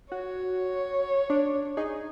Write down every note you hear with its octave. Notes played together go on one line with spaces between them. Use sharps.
F#4 C#5
D4
D#4 G#4